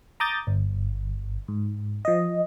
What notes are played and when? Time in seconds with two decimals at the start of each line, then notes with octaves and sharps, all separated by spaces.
0.20 A#5 D6 D#6 G6 A6
0.47 G1
1.48 G#2
2.05 F3 D#5